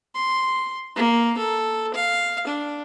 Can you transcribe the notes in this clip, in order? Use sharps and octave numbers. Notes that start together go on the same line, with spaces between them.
C6
A#3
A4
F5
D4